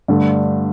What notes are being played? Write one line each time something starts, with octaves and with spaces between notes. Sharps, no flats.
G2 D3 A3